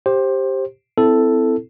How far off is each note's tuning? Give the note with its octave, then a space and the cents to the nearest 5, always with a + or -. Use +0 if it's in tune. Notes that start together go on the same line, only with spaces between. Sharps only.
G4 +0 C5 +15
C4 -25 E4 +0 A4 +0